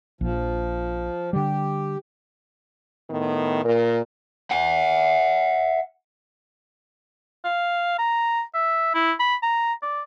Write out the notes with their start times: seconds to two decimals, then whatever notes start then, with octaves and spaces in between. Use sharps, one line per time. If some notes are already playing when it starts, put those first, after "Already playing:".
0.21 A#1 F3
1.33 D3 G3 G4
3.10 A2 D#3 B3
3.65 A#2 A#4
4.51 E5 F#5
7.45 F5
7.99 A#5
8.54 E5
8.95 E4
9.20 B5
9.43 A#5
9.82 D5